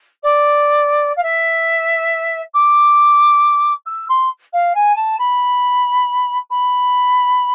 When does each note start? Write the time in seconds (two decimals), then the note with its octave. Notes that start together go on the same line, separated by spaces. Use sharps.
0.23 D5
1.16 F5
1.23 E5
2.54 D6
3.86 E6
4.09 C6
4.53 F5
4.75 G#5
4.96 A5
5.19 B5
6.50 B5